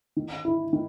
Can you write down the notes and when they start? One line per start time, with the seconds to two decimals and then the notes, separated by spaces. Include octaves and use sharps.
0.16 D#3
0.45 E4
0.73 D#3